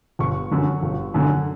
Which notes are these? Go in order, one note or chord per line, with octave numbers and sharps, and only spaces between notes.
G1 C#6
F#2 D3
G1
F#2 D3